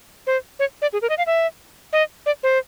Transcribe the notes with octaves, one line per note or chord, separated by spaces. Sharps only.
C5
C#5
D5
G#4
A#4
D#5
F5
E5
D#5
D5
C5